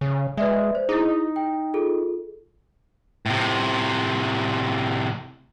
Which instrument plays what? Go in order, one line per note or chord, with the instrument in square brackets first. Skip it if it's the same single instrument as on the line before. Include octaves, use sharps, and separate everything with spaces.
[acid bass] C#3
[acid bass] G#3 [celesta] B4 D5 E5
[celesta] C5
[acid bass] D#4 [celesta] E4 G#4
[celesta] G5
F4 G#4 A4
[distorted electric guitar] A2 C3